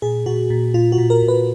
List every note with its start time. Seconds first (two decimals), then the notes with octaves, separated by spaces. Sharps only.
0.02 A#2 G#4
0.26 A#2 F#4
0.50 A#2
0.74 A#2 F4
0.92 F#4
0.98 A#2
1.10 A#4
1.22 A#2
1.28 B4